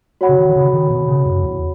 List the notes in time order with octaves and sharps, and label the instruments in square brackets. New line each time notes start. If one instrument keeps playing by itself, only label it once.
[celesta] F#4 C#5 F#5 B5
[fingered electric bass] C#3
D#3
D#3
C#3
D#3
B2
C#3
F#2
E2